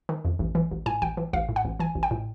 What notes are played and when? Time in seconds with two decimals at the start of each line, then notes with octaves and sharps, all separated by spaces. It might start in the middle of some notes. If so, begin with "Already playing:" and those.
0.09 D#3
0.25 F2
0.39 A1
0.55 E3
0.71 A1
0.86 A2 G#5
1.02 A1 G5
1.17 E3
1.33 A1 F5
1.49 A2
1.56 F#5
1.65 A1
1.80 E3 G#5
1.95 A1
2.03 G5
2.11 A2